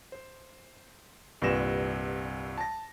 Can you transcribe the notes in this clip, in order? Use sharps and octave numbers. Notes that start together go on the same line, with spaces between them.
C5
C2 G2 A#2 B4 A#6 E7
A5 A#6